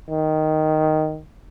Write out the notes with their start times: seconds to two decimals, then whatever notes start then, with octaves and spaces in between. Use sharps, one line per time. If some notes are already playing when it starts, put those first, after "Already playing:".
0.10 D#3